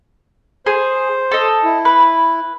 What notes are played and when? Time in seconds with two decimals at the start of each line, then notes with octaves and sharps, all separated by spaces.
0.66 G#4 C5
1.31 A4 D#5
1.64 E4
1.85 B4